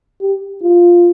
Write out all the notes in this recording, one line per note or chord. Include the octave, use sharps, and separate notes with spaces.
G4
F4